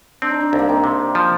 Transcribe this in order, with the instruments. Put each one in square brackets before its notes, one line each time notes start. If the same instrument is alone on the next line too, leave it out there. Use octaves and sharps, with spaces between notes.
[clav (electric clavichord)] C4 [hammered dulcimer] D4
[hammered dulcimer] D#4
D4
[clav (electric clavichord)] C2 [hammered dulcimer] D#4
[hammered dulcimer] A#3 D4
C4 D#4
[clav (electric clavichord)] C3
F3